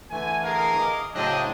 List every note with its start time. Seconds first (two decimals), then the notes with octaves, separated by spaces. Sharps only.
0.11 D3 E3 A3 G#5
0.43 G#4 A#4 F5
0.78 D#5 D6
1.14 A2 C#3 F#3 C4 D4 D#5